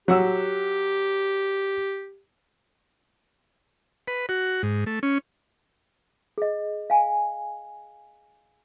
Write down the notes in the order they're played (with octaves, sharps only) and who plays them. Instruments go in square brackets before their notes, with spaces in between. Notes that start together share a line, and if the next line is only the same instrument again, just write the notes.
[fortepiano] F#3 F#5 E6 [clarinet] G4
[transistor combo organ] B4
F#4
G#2
A3
C#4
[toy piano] G#4 D#5
F5 G#5